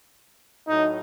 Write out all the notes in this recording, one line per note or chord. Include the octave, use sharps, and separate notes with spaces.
A2 F#3 A3 D#4